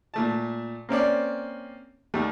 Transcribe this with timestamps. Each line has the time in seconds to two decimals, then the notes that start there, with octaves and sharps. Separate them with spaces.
0.14 A#2 A3 A5
0.89 A#3 C4 C#4 D5
2.14 D#2 G3 A3